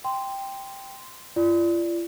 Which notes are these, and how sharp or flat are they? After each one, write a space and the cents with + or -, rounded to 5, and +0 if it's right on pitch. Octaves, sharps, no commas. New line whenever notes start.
G5 +5 C6 -10
F4 -40 D5 +0